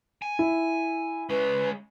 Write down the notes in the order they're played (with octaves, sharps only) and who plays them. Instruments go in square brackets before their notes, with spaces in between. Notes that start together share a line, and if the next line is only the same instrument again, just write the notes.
[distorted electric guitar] G#5
[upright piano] E4
[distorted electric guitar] G#3 C#4 [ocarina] B4